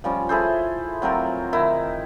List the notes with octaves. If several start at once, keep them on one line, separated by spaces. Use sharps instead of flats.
F3 G3 C#4
E4 G#4 A4 C5
F#3 C4 F4 A#4
D#3 E4